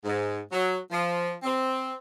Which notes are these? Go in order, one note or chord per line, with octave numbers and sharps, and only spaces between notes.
G#2
F#3
F3
C4